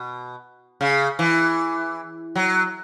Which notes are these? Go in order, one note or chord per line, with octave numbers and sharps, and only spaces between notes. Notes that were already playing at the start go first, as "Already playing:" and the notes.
Already playing: B2
C#3
E3
F#3